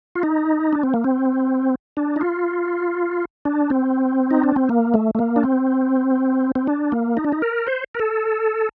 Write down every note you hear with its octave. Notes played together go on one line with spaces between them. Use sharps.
F4
D#4
D4
C4
A#3
C4
D4
D#4
F4
D4
C4
D#4
D4
C4
A#3
A3
A3
A#3
D4
C4
C4
D4
A#3
D#4
D4
D#4
A#4
C5
A#4
A4